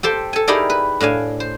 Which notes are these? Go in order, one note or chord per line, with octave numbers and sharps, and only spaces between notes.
G4 A4 C5 G5
A4 G#5
D#4 E4 G4 G#4 A#4 D5
B4
A2 D4 F5 G#5
C5